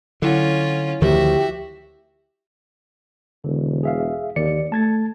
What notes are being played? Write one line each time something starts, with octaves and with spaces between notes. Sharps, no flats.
D3 F#3 C#4 E4 F4 F#5
D2 D#3 F3 F#4 G4 E5
E1 D3
G#4 E5 F5
D#2 D#3 D5 C#7
A3 A5 G#6 A6